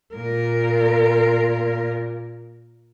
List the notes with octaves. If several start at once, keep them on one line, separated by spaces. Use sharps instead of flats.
A#2 A#4